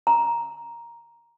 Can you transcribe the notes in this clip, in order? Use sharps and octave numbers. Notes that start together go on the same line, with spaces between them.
A#5